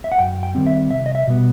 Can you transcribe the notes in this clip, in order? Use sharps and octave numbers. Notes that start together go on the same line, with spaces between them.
E5
F#5
F#2 G5
G5
D#3 G3 C4
E5
C2 E5
D#5
E5
B2 G3 B3